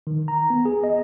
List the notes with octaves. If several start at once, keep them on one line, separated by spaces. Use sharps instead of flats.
D#3
A#5
B3
G#4
D#5